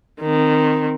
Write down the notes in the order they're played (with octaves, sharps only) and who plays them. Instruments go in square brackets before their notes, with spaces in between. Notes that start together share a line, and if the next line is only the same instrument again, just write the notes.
[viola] D#3 C4